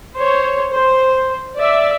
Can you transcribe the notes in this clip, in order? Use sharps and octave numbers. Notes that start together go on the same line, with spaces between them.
C5 C#5
C5
D5 E5